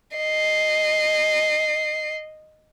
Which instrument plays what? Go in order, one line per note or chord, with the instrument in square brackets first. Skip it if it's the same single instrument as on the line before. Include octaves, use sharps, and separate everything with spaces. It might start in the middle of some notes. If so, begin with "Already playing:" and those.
[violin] D#5 C7